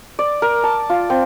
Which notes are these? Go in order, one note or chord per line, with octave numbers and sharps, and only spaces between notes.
D5
A#4
A5
F4
C4